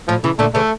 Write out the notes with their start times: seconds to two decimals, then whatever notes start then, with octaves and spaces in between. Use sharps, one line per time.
0.08 A2 F3
0.24 C#3 E3
0.39 A#2 D3 A3
0.55 C#3 E3 A3